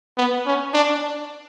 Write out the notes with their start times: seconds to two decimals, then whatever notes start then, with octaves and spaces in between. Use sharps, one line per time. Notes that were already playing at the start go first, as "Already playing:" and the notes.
0.17 B3
0.46 C#4
0.73 D4